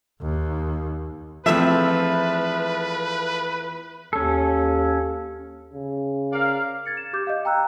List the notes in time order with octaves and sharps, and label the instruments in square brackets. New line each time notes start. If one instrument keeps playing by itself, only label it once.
[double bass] D#2
[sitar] E2 E5 [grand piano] F3 A3 C4 [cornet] B4
[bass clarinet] D#2 [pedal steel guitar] C#4 A4
[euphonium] C#3
[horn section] A#4 D5 F5
[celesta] G#6 A6 C#7
E7
G4 D6 G6
D#5 F5
G5 A#5 E6 F#6